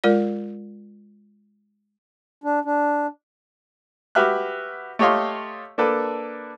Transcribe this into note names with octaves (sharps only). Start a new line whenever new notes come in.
G#3 F4 A#4 D5
D4
D4
F#4 G4 B4 E5 F6 F#6
A3 G4 C#5 D#5 F5 C6
A#3 D4 A4 B4